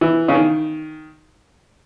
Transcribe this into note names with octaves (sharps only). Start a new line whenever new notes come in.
E3
C#3
D#3